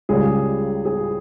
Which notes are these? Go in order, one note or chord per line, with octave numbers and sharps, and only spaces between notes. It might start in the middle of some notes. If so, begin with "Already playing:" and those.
C#2 C#3 G3 G#4
G#4